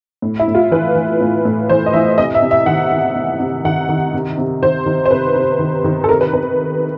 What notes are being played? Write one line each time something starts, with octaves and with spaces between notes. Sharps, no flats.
A2
E4
A2
F4
E3 B4
E3
A2
A2
E3 C5
D#5
E3 E5
C3 D#5
E5
C3
E5
D#3 F#5
D#3
C3
C3
D#3 F#5
D#3
C3
C3
D#3 C5
D#3
C5
C3 B4
C3
D#3
D#3
A4
C3 A#4
B4
C3 B4